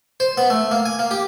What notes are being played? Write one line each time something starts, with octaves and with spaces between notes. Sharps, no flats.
C5
B3
A3
A#3
G#5
A#3
G4